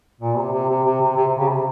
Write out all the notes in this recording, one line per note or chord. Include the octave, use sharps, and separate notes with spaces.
A#2
C3
C3
C3
C3
C3
C3
C3
C#3
C3